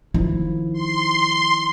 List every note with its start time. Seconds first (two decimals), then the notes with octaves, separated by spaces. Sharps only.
0.14 D#3 F3 E4
0.73 C6